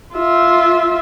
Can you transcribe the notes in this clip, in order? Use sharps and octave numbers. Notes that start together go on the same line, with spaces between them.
F4 E5